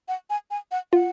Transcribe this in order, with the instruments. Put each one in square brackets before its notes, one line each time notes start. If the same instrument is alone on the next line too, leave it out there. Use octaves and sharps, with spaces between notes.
[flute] F#5
G#5
G#5
F#5
[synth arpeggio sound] F4 [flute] F#5